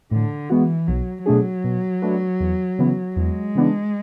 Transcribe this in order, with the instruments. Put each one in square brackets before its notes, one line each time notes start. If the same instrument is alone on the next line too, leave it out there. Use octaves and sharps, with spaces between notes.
[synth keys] A2 [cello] D3
[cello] E3 [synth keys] G#3 B3 F#4
[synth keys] B1 [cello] F#3
[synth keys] B2 A3 D4 G#4 [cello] F#3
[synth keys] B2
A3 D4 F#4 B4
E2
C#3 E3 B3
[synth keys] E2 [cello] G#3
[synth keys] C#3 E3 B3 D4